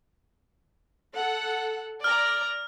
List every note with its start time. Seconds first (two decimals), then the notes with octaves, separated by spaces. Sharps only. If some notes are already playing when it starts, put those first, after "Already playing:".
1.16 A4 F#5
2.04 D5 A#5 F6